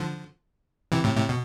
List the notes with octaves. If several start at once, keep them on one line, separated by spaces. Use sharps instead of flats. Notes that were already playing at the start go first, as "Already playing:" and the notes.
Already playing: D3 F3
C3 E3
A2 C3
A2 C3
B2